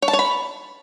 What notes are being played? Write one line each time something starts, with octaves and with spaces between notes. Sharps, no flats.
C#5
A5
C#5
B5